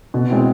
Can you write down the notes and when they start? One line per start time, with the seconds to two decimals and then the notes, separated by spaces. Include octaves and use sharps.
0.14 B2
0.30 G#3 C4 E4